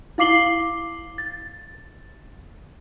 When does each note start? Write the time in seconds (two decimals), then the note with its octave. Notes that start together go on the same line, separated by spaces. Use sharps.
0.18 E4 F5 D6 C7 F#7 G7
1.18 A6